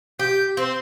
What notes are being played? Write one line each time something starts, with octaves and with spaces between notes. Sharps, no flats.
G4 G6
C4 C5